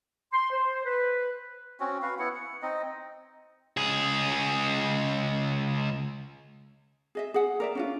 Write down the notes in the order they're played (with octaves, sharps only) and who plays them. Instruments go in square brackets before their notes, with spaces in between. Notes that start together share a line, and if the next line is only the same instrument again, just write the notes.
[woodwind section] C6
C5
B4
[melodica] C4 C#4 F#4
F#4 B4 F5
B3 E4 F#5
F#5
C4 D#4 D#5
[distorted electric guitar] C#2 G#4
[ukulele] G#4 D#5 E5
G#4 F#5
A#4 D5 E5
C#4 D4 F4